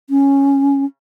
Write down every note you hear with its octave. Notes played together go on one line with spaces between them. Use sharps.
C#4